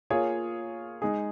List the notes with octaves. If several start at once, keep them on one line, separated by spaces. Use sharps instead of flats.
A#3 F4 G#4 C#5
G#3 D#4 G#4